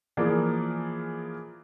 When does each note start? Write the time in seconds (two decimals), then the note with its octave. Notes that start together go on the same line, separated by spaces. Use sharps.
0.17 E3 F3 A#3 G#4 A#4 D5